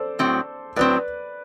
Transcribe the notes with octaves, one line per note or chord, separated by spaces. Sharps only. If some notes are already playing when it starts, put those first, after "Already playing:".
Already playing: A4 C5 D5
A2 F#3 C4
A2 F#3 C4 B4 D5